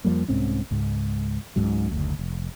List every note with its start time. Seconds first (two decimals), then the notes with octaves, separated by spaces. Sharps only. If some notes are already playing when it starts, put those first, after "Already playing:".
0.05 F2 F3 G3 A#3
0.28 C2 G#2 C4 C#4
0.71 C#2 G#2
1.56 C#2 G#2 C#3 F#3
1.92 F#1 D2
2.19 F1